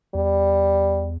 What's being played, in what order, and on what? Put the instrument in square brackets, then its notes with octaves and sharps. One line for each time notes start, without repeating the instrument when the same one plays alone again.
[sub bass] E2 [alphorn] G3